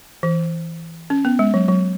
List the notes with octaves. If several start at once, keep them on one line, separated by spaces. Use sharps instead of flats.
E3
C#4
B3
G#3
F#3
F#3